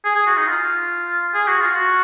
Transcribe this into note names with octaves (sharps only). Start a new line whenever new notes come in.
G#4
G#4
F#4
D#4
F4
G#4
F#4
F4
F#4